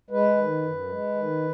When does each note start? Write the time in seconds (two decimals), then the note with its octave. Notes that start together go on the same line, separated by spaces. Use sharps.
0.10 G#3 B4
0.37 D#3
0.63 F#2
0.89 G#3
1.15 D#3